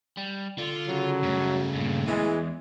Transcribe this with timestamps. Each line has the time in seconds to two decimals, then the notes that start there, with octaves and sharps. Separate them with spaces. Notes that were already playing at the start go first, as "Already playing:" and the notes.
0.18 G3
0.58 D3 F4
0.88 C#3 F#3
1.23 F#2 G3 A3
1.75 G2 A#2
2.07 E2 E3 G#3